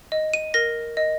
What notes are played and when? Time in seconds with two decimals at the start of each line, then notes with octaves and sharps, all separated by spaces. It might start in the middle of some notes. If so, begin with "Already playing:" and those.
0.12 D#5
0.34 D#7
0.54 A#4 A#6
0.97 D#5